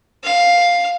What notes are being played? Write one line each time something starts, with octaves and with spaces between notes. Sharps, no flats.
F5